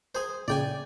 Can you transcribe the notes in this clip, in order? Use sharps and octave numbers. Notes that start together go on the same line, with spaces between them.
G#4 C5
A#2 C#3 D5 G5 G#5